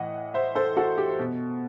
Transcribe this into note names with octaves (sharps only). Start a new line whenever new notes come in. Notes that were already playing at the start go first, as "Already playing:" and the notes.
Already playing: A2 E3 D#5 F#5
C5 E5
A4 C5
F#4 A4
G4
B2